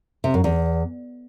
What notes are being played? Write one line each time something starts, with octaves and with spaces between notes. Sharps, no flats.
C3
F#2
E2